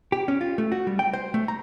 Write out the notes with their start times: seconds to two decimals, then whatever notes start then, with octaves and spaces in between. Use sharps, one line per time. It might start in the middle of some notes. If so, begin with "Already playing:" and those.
0.12 G4
0.28 C#4
0.41 F4
0.58 A3
0.72 F#4
0.87 G3
0.99 G5
1.13 C5
1.34 A3
1.48 A#5